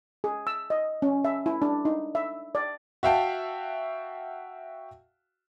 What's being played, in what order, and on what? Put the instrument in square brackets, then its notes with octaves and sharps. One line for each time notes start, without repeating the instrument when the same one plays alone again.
[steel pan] G#4
E6
D#5
C#4
E5
E4
D4
D#4
E5
D5
[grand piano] F#4 E5 F5 G5 A5